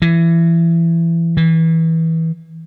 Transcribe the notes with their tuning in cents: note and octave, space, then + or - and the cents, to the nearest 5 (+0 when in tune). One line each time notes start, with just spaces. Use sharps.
E3 +20
E3 -20